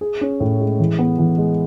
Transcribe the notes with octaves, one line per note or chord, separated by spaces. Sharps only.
G#4
C#4
A2
G#3
E3
B3
E3
G#3